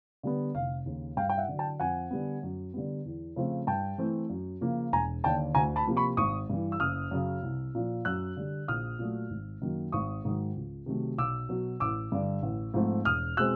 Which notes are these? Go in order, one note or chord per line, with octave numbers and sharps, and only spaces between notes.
D3 G3 B3
F1 F5
D#2 C#3
G2 F5 G5
G5
E5 F#5
D3 F#3
G5 A5
F2 F#5 G#5
D3 G3 B3
F#2
D3 G3 B3
E2
C#3 F3 A3 C4
G2 G5 A5
E3 A3 C4
F#2
C#3 F3 A#3
E1 G#5 A#5
D#2 D3 G5 A5
D2 G#5 A#5
A5 B5
C3 F3 A#3
B5 C#6
G#1 C#6 D#6
G2 E3
E6
F#1 D#6 F6
F#2 C#3
C2
A#2 F3
F#2 E6 F#6
D3 G3
A#1 D#6 F6
A#2 F#3 A3
G#1
F#2 D#3 F#3 A#3
G#1 C#6 D#6
G#2 D#3 F#3
C#2
C3 D#3 F#3 A3
B1 D6 E6
B2 F#3
A1 D6 E6
G2 D3
A1
G#2 F3 A3 C4
E1 D#6 F6
B2 G#3 C4 E6 F#6